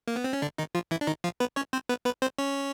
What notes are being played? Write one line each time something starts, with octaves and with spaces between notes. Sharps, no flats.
A#3
B3
C4
C#4
D3 D4
D#3 D#4
F3 F4
E3 E4
D4
D#3 D#4
F3 F4
B3 B4
C#4 C#5
C4 C5
B3 B4
B3 B4
C4 C5
C#4 C#5